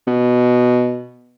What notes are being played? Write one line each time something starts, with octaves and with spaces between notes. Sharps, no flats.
B2